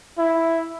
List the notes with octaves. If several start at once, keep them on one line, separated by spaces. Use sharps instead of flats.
E4